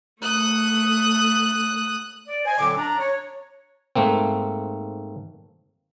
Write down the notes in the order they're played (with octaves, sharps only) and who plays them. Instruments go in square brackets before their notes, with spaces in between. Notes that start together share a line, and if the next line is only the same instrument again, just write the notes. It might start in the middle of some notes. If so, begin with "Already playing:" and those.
[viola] A3 [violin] D#6 F#6
[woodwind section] D5
C5 D#5 G#5
A#2 D3 F#3 C4 A4 D6
D4 A#5
C#5
[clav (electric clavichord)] G#2 A3 A#3 C4